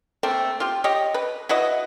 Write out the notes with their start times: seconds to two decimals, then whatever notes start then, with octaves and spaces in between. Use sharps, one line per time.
0.23 A3 A#3 C4
0.60 F4 G4
0.84 G4 C#5 D#5
1.14 B4
1.49 E4 F#4 B4 D#5